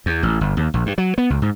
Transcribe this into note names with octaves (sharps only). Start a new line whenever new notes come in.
E2
A1
G1
D#2
A#1
G2
F#3
B3
C#2
G#2